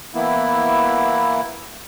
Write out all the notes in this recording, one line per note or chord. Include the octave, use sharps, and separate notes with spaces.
E3 A#3 B3 E4